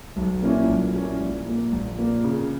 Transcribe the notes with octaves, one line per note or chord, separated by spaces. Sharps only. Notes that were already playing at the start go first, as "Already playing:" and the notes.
B1
A#2 A#3 C#4 E4
B1
A#2 A#3 C#4 E4
A#1
A#2 A#3
A#1
A#2 A#3
C#3